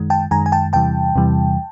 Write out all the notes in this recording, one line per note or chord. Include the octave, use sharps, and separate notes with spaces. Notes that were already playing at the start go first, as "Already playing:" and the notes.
Already playing: F#2 D#3 G#3
G5 A5
F#2 D#3 G#3 G#5 A#5
G#5
G5 A5
E2 C3 E3 G3 G5 A5
E2 C3 E3 G3